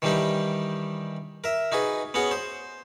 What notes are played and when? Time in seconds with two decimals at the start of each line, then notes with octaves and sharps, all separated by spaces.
0.02 D#3 E3 G3 D4 D#4 G4
1.44 A#4 E5
1.72 D#4 F#4 G#4 B4
2.14 B3 C#4 F#4 G#4 F#5 C#6
2.31 C5